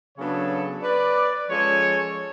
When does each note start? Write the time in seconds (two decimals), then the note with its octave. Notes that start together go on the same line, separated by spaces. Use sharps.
0.16 C#3 F#3 B3 D4 A4 C#5
0.83 B4 D5
1.48 F3 G#3 C#4 A4 C#5